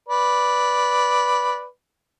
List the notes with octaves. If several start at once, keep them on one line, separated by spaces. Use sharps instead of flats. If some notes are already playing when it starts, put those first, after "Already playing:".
B4 D5